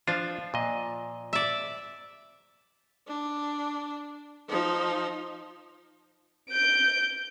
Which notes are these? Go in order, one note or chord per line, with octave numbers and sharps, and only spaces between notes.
F3 D4 F4
A#2 D#5
D5 E5
D4
F3 D#4
G6 D7